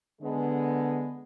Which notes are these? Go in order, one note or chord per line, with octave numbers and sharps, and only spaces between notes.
D3 G#3 B3